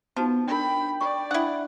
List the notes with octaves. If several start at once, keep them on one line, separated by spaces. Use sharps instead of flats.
F3 B3 D#4 F#4 A5
D4 A#4 G5 B5
D5 C#6
D4 E4 F#5 D#6